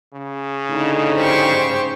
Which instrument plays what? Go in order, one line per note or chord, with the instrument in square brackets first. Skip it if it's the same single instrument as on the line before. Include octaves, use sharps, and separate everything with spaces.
[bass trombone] C#3
[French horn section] A2 D3 D#4
[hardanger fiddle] G4 C#6 [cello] C5